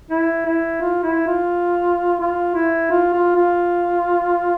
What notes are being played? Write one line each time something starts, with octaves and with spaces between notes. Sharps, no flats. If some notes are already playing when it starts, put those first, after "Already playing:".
E4
E4
F4
E4
F4
F4
E4
F4
F4
F4